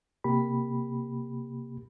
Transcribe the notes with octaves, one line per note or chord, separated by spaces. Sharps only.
C3 A#3 G4 B5